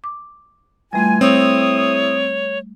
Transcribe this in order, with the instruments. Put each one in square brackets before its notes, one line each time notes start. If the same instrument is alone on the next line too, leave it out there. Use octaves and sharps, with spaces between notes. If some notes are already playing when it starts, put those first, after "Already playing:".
[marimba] D6
[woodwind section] E3 F4 G#5 [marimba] G3 A3
[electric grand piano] C4 [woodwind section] E4 A4 D#6 [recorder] C#5